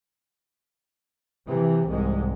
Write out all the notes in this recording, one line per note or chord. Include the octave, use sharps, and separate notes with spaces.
C3 E3
C2 G#2 G#3